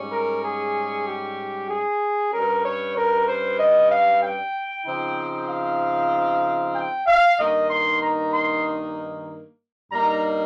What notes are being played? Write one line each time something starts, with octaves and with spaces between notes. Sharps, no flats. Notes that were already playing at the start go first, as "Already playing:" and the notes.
Already playing: G#2 G3 C#4
A#4
G#4
G4
G#4
G2 G3 C#4 A#4
C#5
A#4
C5
D#5
F5
G5
C#3 F3 C4 D#4
F5
G5
F5
G2 D#3 A#3 D#4 D#5
C6
A#5
C6
G2 G3 A#3 D#4 A#5